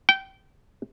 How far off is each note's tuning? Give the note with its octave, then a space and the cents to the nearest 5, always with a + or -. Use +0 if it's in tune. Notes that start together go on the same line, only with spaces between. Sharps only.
G5 -20